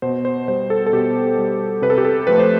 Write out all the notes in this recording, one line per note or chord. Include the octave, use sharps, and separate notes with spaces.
B2 C5
C5
G3 C5
A4
A4
B2 G4
G3
C3 B4
A4
G4
A4
F3 A3 B4
C5